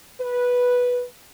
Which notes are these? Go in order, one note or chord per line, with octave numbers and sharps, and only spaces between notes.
B4